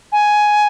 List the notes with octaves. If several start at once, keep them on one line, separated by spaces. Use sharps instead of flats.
G#5